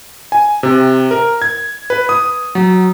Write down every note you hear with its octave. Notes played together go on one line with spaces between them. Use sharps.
G#5
C3
A#4
G#6
B4
D#6
F#3